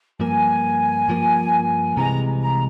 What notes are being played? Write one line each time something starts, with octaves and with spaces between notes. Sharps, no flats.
G2 F3 A#3 G#5
G2 F3 A#3
C2 C3 E3 G#3 A#5
A#5